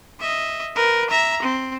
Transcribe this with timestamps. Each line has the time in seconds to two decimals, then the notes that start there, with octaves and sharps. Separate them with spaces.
0.20 D#5 E5
0.76 A#4 B4
1.10 E5 A#5
1.42 C4